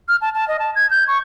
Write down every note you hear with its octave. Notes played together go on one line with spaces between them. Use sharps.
F6
A5
A5
D#5
A5
G#6
G6
C#6